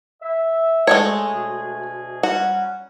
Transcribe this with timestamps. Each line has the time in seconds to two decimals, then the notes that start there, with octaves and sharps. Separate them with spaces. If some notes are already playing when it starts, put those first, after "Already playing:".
0.22 E5
0.87 G#3 A3 C#5
1.30 D2 B2 G#4
2.23 F#3 G3 C#4 F#4